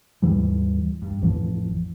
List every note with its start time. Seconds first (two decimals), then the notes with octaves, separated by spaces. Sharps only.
0.22 D#2 G#2 E3 G3
1.02 G2
1.21 A1 F2 E3 F3